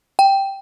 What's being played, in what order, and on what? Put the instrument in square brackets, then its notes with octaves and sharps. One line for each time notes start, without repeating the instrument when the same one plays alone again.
[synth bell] G5